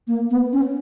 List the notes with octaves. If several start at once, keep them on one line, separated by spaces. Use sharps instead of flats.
A#3
B3
C#4